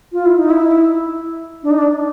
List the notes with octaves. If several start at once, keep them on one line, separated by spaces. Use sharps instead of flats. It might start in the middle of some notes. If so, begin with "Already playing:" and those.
F4
E4
D#4
E4
D4
D#4
D4